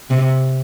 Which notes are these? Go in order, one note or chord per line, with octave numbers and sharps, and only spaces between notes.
C3